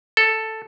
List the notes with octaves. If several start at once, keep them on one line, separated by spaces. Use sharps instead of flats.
A4